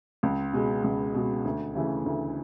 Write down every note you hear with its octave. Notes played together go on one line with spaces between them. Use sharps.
C#2
B2 G#3
C#2
B2 G#3
D2
C#3 E3 A3
D2